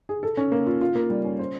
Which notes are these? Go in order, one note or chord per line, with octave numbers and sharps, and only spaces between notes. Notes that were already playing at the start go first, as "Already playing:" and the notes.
G#4
A4
C#4
A#3
F4
F4
A#3
G3
C#4
C5